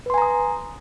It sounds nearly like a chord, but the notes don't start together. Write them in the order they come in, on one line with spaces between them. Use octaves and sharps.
B4 C6 G#5 A#5 D#6